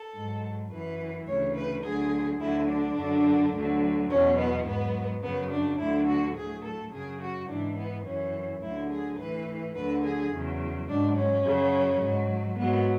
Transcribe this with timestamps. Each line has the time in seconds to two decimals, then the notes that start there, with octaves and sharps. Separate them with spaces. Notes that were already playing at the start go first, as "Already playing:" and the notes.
Already playing: A4
0.14 G#2 F#3
0.71 F#2 E3 B4
1.27 D2 C#3 E3 C#5
1.56 B4
1.84 D2 D3 F#3 G#4
2.40 D2 D3 F#3 E4
2.69 D4
2.97 F#2 D3 F#3
3.54 D2 D3 F#3
4.10 E2 B2 F#3 C#4
4.39 B3
4.66 G#2 F#3 B3
5.23 F#2 C#3 F#3 B3
5.51 D4
5.80 D2 D3 F#3 E4
6.08 F#4
6.36 A2 F#3 G#4
6.65 A4
6.93 F#2 C#3 F#3 G#4
7.21 F#4
7.49 G#2 E3 D4
7.77 B3
8.05 F#2 E3 C#4
8.62 D2 D3 F#3 E4
8.90 G#4
9.19 A2 E3 B4
9.76 D2 D3 F#3 B4
10.04 G#4
10.32 E2 C#3 F#3
10.89 G#2 F#3 D4
11.17 C#4
11.45 F#2 C#3 F#3
12.01 G#2 F#3
12.58 G#2 F#3 B3